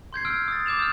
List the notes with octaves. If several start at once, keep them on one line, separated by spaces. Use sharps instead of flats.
C6 G6 G#6 C7
E6 F6 G#6 D7
D#6 A6
D6 G6 E7 F7
D#6 F6